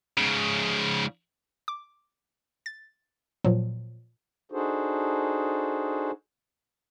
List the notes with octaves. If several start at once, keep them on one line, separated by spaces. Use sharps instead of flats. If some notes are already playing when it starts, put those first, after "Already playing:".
G#2 C#3
D6
A6
A#2 F3 F#3
D4 D#4 F#4 G#4 A4 C5